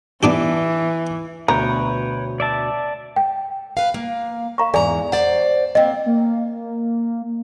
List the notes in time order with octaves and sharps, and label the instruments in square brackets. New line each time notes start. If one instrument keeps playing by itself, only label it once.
[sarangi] E3 [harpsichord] B3 D4 G4
[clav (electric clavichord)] D2 B2 [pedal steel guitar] B4 C#5 G5 [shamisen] A#5
[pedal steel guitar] D5 E5 A5
[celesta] G5
[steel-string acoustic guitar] B4 F5
A#3
[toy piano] F5 A#5 C#6
[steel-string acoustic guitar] E2 G#2 A#5 [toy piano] G#4 D5 G#5
[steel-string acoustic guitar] C5 D5 [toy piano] F#5
[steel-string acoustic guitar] A#3 C4 [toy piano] D#5 G5
[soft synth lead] A#3